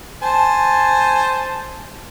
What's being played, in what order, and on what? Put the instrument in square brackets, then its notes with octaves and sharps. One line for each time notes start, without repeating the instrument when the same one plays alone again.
[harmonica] C5 G#5 A5